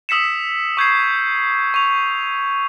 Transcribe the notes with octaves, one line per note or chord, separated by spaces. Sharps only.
D#6 E6 B6 C#7 E7
C#6 G6 G#6 C7
C#6 F7